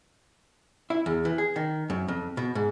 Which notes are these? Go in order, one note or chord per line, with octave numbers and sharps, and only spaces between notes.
E4
E2
E3
G#4
D#3
F#2
F2
B2
G#2